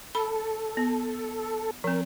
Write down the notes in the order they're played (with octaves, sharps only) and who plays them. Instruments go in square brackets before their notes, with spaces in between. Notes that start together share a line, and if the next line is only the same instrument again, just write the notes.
[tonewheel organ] A4 [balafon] B5
[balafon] B3
[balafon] F3 C4 [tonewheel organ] A#4